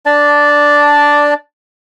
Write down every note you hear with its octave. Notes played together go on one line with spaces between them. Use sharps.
D4 D5 A5